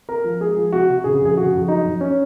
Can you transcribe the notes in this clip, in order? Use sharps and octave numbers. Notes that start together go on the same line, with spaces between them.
C4 A#4
F3
G#3 G#4
F3
C3 F#4
C3
C#3 G#4
F2 G#4
C#3 F#4
F2
F#3 D#4
F2
C#4